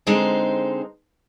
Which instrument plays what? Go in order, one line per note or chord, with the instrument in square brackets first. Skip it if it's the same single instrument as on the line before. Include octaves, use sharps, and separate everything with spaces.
[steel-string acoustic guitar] D3 G#3 C4 D#4 C5